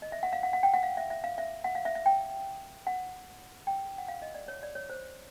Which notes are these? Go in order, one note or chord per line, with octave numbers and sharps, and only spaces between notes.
D#5
E5
F#5
F5
F#5
F#5
G5
F#5
F5
E5
E5
F5
E5
F#5
F5
E5
E5
G5
F#5
G5
F#5
F5
D#5
D5
C#5
D5
C#5
C5